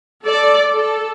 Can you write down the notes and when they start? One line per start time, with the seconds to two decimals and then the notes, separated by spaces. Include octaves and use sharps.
0.23 A4 D5
0.74 A4